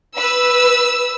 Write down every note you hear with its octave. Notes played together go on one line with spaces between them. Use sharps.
B4 E6